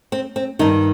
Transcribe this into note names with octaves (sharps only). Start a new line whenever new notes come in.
C4
C4
G2 D#3 D#4